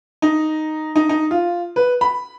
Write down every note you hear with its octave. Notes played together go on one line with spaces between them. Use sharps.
D#4
D#4
D#4
F4
B4
B5